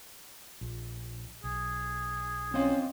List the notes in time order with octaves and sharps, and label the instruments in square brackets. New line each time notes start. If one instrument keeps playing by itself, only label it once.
[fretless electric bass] A#1
[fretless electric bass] B1 [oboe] G#4
[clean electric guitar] C4 D#5 F5 [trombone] C#4